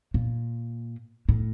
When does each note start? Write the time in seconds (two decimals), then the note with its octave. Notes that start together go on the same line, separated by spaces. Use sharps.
0.14 A#2
1.29 A2